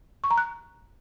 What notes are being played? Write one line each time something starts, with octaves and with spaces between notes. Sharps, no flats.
C#6
A#5
F#6